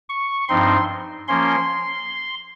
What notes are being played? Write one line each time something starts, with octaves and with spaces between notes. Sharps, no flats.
C#6
G2 F3 C4 D#4 C6
F3 A#3 C#4 C6